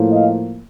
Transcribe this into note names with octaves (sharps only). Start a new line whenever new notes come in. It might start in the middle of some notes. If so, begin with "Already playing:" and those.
Already playing: A2 F3 A#3
D#5 F5